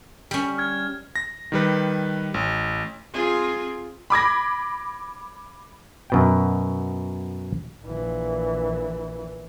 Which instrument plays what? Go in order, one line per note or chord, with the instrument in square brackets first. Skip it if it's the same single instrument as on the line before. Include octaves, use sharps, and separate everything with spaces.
[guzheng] G3 C#4
[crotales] F6 G#6
[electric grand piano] A#6
D#3 G3 B4
A1
[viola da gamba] C4 F4 G#4
[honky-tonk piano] B5 D6 G#6 A#6
[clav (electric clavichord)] F#2 B2 G5
[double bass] A#1 E3